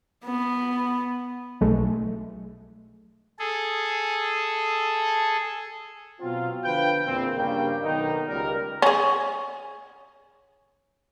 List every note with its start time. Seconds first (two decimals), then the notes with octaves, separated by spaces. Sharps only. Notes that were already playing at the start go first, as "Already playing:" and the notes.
0.24 B3
1.61 B1 G#3 A3
3.39 G#4 A4
6.20 B2 F#3 C4 F4
6.63 D3 F3 B4 F5 G5
7.06 E2 A#2 C4
7.35 G2 C#3 G3 A#3 G5
7.82 B1 D#3 B3 D#4
8.27 C#2 G3 A#4
8.82 C#4 G#4